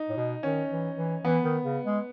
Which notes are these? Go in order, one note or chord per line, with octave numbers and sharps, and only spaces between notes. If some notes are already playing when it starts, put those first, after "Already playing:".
Already playing: D#4
A2
B2
D#3 C#4
E3
E3
E3 B3
D#3
C#3
G#3